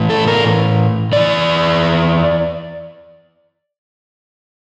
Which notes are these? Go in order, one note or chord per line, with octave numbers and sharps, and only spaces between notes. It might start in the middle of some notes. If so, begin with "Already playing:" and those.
Already playing: A2 E3
A4
A#4
E2 E3 D5